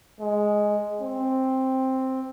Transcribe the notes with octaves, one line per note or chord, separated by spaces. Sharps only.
G#3
C4